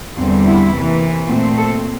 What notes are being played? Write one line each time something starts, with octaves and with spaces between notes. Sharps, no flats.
E2 D3 G3 C4 F4
E4
C3 E3 A#3
A#2 A3 C4 F4
A4